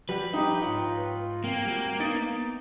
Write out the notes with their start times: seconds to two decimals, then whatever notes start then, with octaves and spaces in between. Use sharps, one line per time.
0.09 F3 G3 B4 F#5
0.33 D#4 G4 D#5
0.62 G#2 F4 C#5 G5
1.44 A#3 C4
1.65 G3 F#4
2.00 B3 D#4 A6 D7